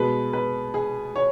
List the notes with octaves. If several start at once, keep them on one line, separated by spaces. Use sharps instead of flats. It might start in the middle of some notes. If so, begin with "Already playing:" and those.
Already playing: B2 G#3 B4
B4
G#4
C#5